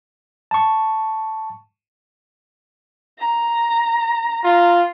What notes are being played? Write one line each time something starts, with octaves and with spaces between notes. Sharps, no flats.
A5 C#6
A#5
F4